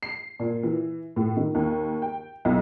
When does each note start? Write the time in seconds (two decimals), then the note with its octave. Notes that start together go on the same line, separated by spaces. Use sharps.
0.03 C7
0.39 A#2
0.63 E3
1.16 A2
1.37 D#3
1.55 D#2
2.02 G5
2.45 B1